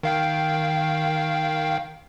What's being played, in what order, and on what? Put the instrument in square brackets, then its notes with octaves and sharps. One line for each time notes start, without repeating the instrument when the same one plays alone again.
[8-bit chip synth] D#3 F5 G5